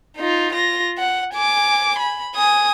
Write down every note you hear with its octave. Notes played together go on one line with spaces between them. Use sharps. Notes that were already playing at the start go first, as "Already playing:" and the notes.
D#4 F4
F4 A#6
F#5
G#5 D6
B5
G#5 D#6